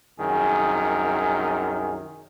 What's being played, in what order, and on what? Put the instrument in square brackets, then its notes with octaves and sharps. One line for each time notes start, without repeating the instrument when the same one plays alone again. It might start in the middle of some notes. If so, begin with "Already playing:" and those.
[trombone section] C2 F#2 D#3 G#4